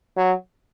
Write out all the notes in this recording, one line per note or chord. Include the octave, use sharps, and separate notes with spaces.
F#3